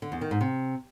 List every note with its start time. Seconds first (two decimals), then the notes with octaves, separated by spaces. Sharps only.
0.02 D3
0.12 E2
0.21 D#3
0.31 G#2
0.41 C3